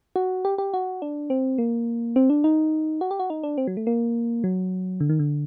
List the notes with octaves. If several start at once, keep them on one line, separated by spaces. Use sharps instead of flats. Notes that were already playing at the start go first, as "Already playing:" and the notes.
F#4
G4
G4
F#4
D4
C4
A#3
C4
D4
D#4
F#4
G4
F#4
D#4
D4
C4
F#3
A3
A#3
F#3
D3
D#3
D3